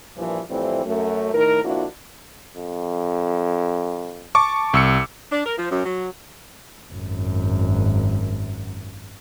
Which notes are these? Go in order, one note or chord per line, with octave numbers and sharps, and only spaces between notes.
G2 A#2 E3 F3
F2 A2 E3 G3 C4
F#2 A3
A2 D#3 A#4
F2 A#3 D4 E4 F#4
F2
A5 C#6 D6
C2 E6 C#7
D4
A#4
F3
F#2
F#3
G#1 F#2